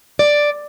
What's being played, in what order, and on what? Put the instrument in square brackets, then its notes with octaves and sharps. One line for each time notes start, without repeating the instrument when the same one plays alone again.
[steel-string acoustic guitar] D5